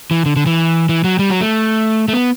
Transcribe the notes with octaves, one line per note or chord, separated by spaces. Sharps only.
E3
D3
D3
E3
E3
F#3
G3
F#3
A3
A3
B3